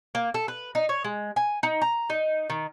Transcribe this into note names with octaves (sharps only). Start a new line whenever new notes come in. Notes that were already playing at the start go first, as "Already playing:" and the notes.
A#3
A4
B4
D#4
C#5
G#3
G#5
D#4
A#5
D#4
D#3